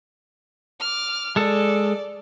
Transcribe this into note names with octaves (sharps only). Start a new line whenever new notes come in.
D6 F6
G#3 A4 D5